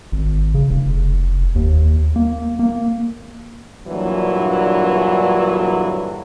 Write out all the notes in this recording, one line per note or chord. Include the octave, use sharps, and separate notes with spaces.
G#1
C#3
F1
D#2
A#3
A#3
G2 A#2 D3 E3 F#3